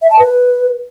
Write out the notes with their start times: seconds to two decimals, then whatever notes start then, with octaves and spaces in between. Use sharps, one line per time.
0.02 E5
0.10 A5
0.19 B4